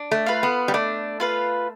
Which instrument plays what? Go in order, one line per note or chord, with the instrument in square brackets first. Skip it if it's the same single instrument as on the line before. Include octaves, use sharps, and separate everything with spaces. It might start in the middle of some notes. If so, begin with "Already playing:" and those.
Already playing: [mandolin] D4
[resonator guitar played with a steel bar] A3
[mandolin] F4 B4 F5
[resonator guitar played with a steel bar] B3
G3
[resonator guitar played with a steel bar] A3 [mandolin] D4
[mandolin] F4 B4 F5